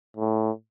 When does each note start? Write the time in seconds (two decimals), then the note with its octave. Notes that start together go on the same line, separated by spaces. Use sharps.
0.17 A2